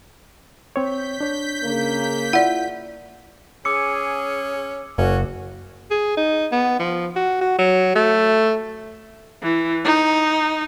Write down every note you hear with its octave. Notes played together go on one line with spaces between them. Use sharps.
C4 C#5 G6 B6
D4 C#5
C#3 A#3
E4 F4 D5 F#5
C#4 G#4 D6 E6 C#7
F#1 C#4 F#4
G#4
D#4
B3
F3
F#4
F#4
F#3
A3
E3
D#4